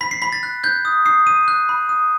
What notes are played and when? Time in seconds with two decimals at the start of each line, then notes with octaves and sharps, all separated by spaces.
0.01 B5 B6
0.11 C7
0.22 B5 B6
0.32 A6
0.43 F#6
0.63 F#6 G6
0.85 D#6
1.06 D#6 C7
1.26 D#6 D#7
1.48 F#6
1.69 B5
1.89 D#6